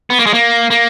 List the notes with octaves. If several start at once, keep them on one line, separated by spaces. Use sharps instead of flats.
B3
A#3
G#3
A#3
A#3